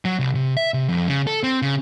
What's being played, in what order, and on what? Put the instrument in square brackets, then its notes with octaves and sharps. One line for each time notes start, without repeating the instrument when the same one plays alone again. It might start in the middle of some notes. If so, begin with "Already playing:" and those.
[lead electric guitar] F#3
C2
C3
E5
C3
F2
C#3
A4
C4
C#3